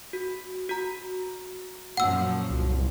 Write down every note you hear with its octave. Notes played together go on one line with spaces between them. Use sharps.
F#4
F#4 A#5
F#2 A#2 F3 F#5 E6
C2